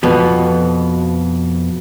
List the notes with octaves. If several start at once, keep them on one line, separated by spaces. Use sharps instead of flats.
F2 B2 B3